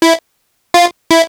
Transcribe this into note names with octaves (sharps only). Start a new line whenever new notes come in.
E4
F4
E4